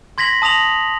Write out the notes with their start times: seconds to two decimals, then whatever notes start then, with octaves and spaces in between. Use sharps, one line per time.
0.18 C6 G#6 A#6 B6 F#7
0.42 A5 D#6 A#6 F7 F#7